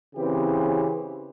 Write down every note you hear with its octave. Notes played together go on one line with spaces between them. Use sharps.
C#3 E3 C4 G4